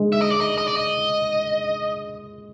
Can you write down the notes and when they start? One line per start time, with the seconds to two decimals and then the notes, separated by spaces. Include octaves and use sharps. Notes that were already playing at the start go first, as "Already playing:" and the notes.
Already playing: G#3
0.12 E5
0.22 D#5
0.31 D5
0.41 D#5
0.58 D#5
0.67 D5
0.77 D#5